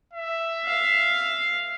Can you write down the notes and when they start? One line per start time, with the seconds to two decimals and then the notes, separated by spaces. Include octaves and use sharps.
0.14 E5
0.65 F5